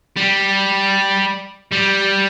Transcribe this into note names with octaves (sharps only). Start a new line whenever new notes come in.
G3
G3